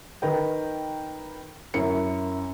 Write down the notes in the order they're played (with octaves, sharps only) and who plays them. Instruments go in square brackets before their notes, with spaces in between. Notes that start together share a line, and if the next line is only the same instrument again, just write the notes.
[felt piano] D#3 A#4 B4 G5
F#2 E4 A#4 C#7